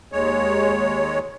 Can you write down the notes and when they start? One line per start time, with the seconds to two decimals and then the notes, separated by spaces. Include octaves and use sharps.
0.12 D#2 G#3 C#5